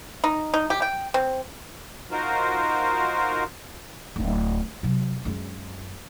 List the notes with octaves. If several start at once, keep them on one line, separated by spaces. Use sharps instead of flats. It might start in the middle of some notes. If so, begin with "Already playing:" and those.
D#4
D#4
G4
G5
C4
D#4 F4 F#4 A#4 C5
D1 C4
C3 F#3
F#2 G#3